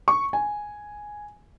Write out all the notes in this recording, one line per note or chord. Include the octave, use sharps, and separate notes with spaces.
C#6
G#5